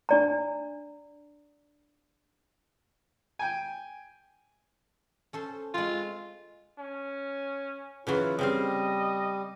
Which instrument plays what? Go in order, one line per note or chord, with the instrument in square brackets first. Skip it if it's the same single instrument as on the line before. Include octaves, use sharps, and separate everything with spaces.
[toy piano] D4 D5 A#5
[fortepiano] G5 G#5
[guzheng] C#4 A4 C5
[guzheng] G#3 C4 [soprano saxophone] F4
[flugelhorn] C#4
[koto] C#3 E3 F#3 [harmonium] E4 F4
[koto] C#3 C4 F5 [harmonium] G3 [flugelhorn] D#5